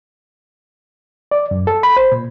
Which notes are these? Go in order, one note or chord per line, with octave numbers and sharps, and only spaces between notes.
D5
F#2
A4
B5
C5
A#2